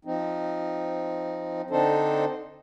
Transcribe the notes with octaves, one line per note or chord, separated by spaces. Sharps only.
F3 C4 D#4
D3 C4 D4 D#4 A4 C5